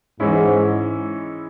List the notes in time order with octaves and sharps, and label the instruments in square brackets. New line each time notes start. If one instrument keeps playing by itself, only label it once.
[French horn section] G#2 [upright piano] E3 G#3 C#4 E4